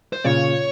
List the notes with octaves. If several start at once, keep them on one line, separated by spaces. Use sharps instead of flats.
C5
A#2 C#3 C#5